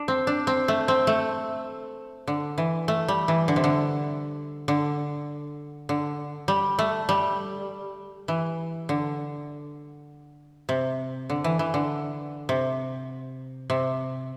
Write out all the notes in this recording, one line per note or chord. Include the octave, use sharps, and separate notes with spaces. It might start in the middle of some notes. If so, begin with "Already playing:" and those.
Already playing: D4
C4
D4
C4
A3
C4
A3
D3
E3
A3
G3
E3
D3
C3
D3
D3
D3
G3
A3
G3
E3
D3
C3
D3
E3
E3
D3
C3
C3